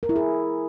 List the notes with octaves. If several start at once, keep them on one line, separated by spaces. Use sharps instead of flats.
A#4
E4
G#4